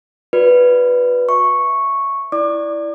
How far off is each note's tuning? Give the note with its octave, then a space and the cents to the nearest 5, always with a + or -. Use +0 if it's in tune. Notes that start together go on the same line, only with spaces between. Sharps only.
F#4 -30 B4 +0 D5 +0
E5 +0 C#6 -5
E4 +0 D5 +0 D6 +35